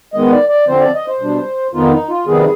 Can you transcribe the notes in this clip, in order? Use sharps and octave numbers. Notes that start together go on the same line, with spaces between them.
D#3 G#3 B3 D#5
D5
D5
D3 F3 C4 C5
D5
D#5
C5
B2 G3 D4
F2 D#3 B3 D#4 F4
D#4
F4
F2 C3 D#3 G3 B3 G#4